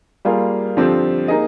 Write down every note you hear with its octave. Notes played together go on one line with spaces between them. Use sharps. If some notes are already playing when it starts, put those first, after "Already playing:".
G3 A#3 F4 G#4
D3 F3 C4 G4 C5
A#3 D#4 G#4 D#5